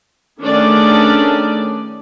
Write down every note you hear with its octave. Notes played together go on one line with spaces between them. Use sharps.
D#3 A3 C#4 D4 G#4 D5